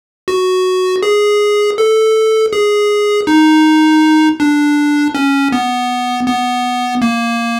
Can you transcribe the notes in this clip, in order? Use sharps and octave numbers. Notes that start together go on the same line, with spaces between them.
F#4
G#4
A4
G#4
D#4
D4
C#4
B3
B3
A#3